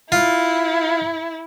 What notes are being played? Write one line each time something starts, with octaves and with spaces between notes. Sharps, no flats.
E4 F4